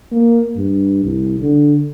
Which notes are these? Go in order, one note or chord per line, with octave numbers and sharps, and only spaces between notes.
A#3
G2
C2
D3